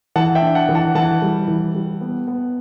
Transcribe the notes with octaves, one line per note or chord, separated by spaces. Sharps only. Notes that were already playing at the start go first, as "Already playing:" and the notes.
E3 F#5 A5
E5 G5
D4
F#5 A5
E3
F#5 A5
E3 F#5 A5
G3
E3
G3
B3
B3